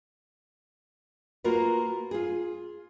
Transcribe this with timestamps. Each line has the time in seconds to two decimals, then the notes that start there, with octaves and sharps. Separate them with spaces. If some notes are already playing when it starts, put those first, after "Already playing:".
1.44 A#3 F4 F#4 A#4 B4
2.11 F4 G#4